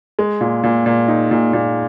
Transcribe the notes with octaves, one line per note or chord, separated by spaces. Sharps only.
G#3
A#2
A#2
A#2
D#4
A#2
A#2